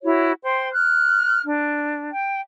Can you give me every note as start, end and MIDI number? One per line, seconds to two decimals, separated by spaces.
0.03 0.34 64
0.03 0.34 66
0.03 0.34 73
0.43 0.71 72
0.43 0.71 79
0.43 0.71 84
0.73 1.41 89
0.73 1.41 90
1.45 2.09 62
2.12 2.40 79